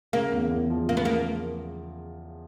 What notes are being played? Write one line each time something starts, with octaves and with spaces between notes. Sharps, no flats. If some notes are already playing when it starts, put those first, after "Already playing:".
C#3 A#3
E2
E2
F3
C#3 A#3
B3
A#3